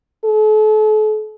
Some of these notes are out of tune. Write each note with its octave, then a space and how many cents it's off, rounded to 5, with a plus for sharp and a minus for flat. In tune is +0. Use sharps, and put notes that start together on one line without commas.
A4 -40